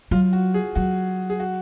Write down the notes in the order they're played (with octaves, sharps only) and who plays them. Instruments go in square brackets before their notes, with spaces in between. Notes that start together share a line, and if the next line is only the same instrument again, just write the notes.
[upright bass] F#3 [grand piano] F4
[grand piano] F#4
G#4
[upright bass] F#3 [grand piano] F#4
[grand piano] G#4
F#4